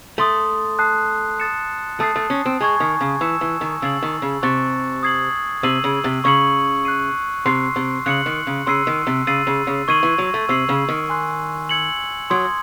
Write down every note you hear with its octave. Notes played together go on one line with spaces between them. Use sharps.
A3 A5 C6 D#6
A5 D#6 F#6 C7
D#6 A6 C#7 E7
A3 A5 D#6 A6 C7
A3
C#4
C4
G#3 G#5 C#6 G#6
D#3
C#3
E3 E6 G#6 C#7 E7
E3
D#3
C#3 E6 A6 C7 F#7
D#3
C#3
C3 C#6 F#6 A6 C#7 E7
D#6 G#6 C7 F#7
C3 E6 C7 D#7 F#7
C#3
C3
C#3 C#6 G#6 C#7 F#7
F#6 C7 D#7
C3 C6 E6 C7
C3
C#3 F#6 C#7 F#7
D#3
C#3
C#3 C6 E6 C7 D#7
D#3
C3
C#3 E6 A6 C7 D#7 F#7
C#3
C#3
D#3 C#6 G#6 C7 D#7 F#7
E3
F#3
A3
C3 E6 C7 D#7 F#7
C#3
D#3
G#5 C6 F#6 C7
E6 G#6 C#7 F#7
F#3 C6 D#6 G#6